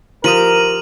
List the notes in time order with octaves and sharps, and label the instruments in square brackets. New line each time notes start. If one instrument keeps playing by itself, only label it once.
[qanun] F3 G4 [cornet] A#4 [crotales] D#6 D#7 F#7